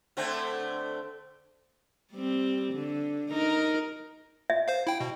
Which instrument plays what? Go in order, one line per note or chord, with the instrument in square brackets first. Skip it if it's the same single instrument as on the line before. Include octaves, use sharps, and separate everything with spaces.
[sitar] D3 A3 C4
[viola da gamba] G3 C4
D3
D#4 A#4
[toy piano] E5
[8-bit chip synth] C5 F5
E4 G5
B2